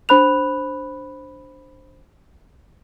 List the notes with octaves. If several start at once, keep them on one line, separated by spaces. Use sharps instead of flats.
D4 C5 B5 F#6 F7